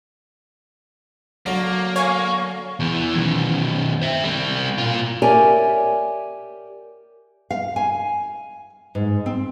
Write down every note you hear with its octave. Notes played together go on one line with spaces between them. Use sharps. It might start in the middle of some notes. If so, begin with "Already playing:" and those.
D3 F#3 A#3
C#5 F5 G#5 C#6
E2 E3
F#2 D#3
C5 E5
G3 C4
A#2 F4
G4 A#4 C#5 D5 E5 G#5
F5
G#5
G#2
C4